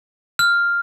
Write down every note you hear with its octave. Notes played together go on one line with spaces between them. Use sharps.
F6